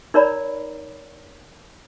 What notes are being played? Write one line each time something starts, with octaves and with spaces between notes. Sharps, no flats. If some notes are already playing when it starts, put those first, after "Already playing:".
D#4 A#4 C#5 D5 A#5 B5